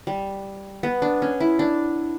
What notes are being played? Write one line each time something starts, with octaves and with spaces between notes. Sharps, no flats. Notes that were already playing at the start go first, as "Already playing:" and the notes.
G3
B3
D4
C#4
E4
D4